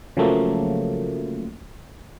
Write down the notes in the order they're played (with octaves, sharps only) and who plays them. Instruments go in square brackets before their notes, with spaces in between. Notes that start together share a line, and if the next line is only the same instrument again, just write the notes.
[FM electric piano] C#3 F3 F#3 A3 A#3